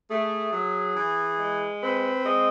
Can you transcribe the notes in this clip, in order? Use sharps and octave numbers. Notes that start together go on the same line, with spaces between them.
A3 G#4
F#3
E3
G#3
C4 B4
G#3 D#5